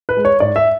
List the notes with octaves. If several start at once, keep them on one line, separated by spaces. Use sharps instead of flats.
B4
G#3
C#5
G#2 D5
E5